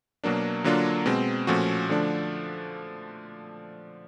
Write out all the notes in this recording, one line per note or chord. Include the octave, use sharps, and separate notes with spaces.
B2 F#3 A#3 D4
D3 F#3 A#3 D4 F4
B2 G#3 C4
A#2 F3 A3 C#4 F#4
D3 F3 A3 D4